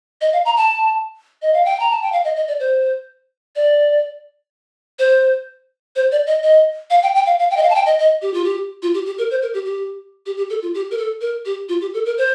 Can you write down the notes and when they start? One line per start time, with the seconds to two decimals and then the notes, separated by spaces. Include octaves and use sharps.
0.21 D#5
0.33 F5
0.45 A#5
0.57 A5
1.42 D#5
1.53 F5
1.65 G5
1.80 A#5
1.91 A5
2.02 G5
2.12 F5
2.25 D#5
2.36 D#5
2.48 D5
2.60 C5
3.56 D5
4.99 C5
5.96 C5
6.12 D5
6.27 D#5
6.43 D#5
6.90 F5
7.03 G5
7.15 G5
7.26 F5
7.39 F5
7.51 G5
7.57 D#5
7.63 F5
7.70 A5
7.75 G5
7.86 D#5
7.99 D#5
8.22 G4
8.34 F4
8.44 G4
8.83 F4
8.94 G4
9.06 G4
9.18 A#4
9.31 C5
9.42 A#4
9.54 G4
9.66 G4
10.26 G4
10.37 G4
10.50 A4
10.62 F4
10.74 G4
10.91 A#4
10.98 A4
11.21 A#4
11.46 G4
11.69 F4
11.81 G4
11.94 A4
12.06 A#4
12.18 C5